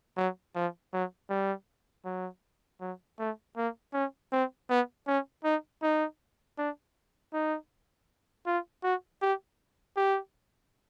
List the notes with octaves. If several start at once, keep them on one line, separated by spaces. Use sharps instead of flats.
F#3
F3
F#3
G3
F#3
F#3
A3
A#3
C#4
C4
B3
C#4
D#4
D#4
D4
D#4
F4
F#4
G4
G4